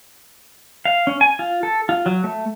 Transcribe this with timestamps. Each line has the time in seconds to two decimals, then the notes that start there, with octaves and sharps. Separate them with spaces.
0.85 F5
1.07 C#4
1.21 G#5
1.39 F4
1.63 A4
1.89 F4
2.06 F#3
2.24 A3